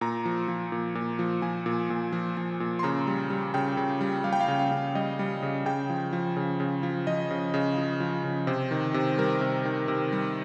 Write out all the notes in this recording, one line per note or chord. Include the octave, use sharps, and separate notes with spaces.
A#2 A#5
F3
F3
A#2
A#2
F3
F3 G#5
A#2
A#2
F3
F3
A#2
C6
C#3 A#5
G3
G3
C#3 G5
C#3
G3
G3 F5
G5
F5
C#3
F5
C#3
G3 D#5
G3
C#3
C#3 G5
F3
F3
C#3
C#3
F3
F3 D#5
C#3
C#3
F3
F3
C#3
C3 C5
D#3
C3
G3 A#4
C3
D#3
C3
G3